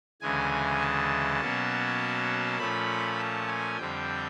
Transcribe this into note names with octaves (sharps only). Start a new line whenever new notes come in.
D2 C#3 E3 G#3 G#5
A5
B2 F#3 A#3 C#4
A#2 F3 A3 C#4 B5
A5
G#5
F2 D3 G3 C4 G5